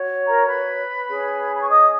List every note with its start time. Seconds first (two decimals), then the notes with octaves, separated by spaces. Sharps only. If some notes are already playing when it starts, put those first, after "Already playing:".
Already playing: F#4 C#5
0.25 A#4 A#5
0.45 B4 B5
1.07 C#4 G#4 C#5
1.54 B5
1.60 C#6
1.69 D#5 D#6